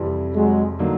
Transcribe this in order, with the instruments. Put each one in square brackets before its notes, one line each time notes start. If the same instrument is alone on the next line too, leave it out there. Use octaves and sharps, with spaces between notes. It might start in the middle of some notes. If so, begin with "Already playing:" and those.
Already playing: [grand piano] F2 C3 E3 G3
[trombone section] F#3 G#3
[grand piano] D3 F#3 A#3 D#4